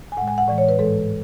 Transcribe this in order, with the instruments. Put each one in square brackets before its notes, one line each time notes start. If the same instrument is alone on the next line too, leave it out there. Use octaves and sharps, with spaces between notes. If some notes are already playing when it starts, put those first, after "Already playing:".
[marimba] G#5
A2 G#3 F#5
G#5
F#5
A2 E3 G#3 D5
C#5
B4
G#2 E3 G#3 A4